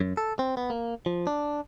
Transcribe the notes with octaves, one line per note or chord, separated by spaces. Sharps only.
F#2
A4
C4
B3
A#3
F3
D4